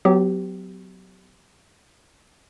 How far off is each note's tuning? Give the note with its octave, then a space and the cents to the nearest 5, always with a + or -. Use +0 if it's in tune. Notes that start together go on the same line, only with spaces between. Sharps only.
F#3 +0 B3 +35 G4 -15